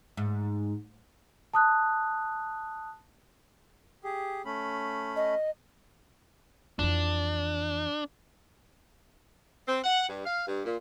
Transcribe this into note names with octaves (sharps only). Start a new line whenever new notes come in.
G#2
A5 D#6 F#6
G4 G#4
A3 C#4 B5
D#5
F2 E3 D4
C4
F#5
G2
F5
G2
A#2